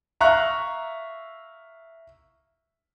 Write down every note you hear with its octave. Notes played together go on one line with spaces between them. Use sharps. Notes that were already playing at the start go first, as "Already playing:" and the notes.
E5 F5 A#5 C#6 F#6